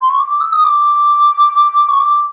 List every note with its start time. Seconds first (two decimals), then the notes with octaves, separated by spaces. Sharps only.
0.01 C6
0.09 C#6
0.18 D6
0.40 E6
0.52 D#6
0.64 D6
1.88 C#6
1.99 D6